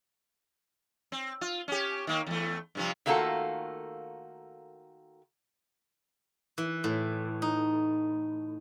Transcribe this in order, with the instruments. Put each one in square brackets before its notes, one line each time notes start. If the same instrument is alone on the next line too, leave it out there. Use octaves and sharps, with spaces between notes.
[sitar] C4
F4
C#4 G4
D#3 A#3
E2 A3
G2 C3 F3
[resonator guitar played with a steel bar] D#3 A3 A#3 F4 F#4 A4
[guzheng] E3
A2
D#4